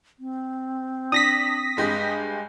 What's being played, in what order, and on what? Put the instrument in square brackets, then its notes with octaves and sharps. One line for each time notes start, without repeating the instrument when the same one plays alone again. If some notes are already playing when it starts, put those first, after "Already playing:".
[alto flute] C4
[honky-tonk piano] D4 [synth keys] D#6 A#6 B6
[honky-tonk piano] G2 G#3 G4